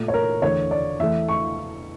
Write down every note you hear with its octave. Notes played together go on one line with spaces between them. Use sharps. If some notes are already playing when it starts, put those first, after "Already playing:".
Already playing: A#2 A3
C#5
A#4
E2 D3 A3 C#5
D5
E2 E3 A3 E5
C#6